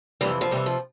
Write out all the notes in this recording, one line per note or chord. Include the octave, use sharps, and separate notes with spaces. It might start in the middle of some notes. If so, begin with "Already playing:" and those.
F2 C3 E3 G3
F3
F2 C3 E3 G3
F3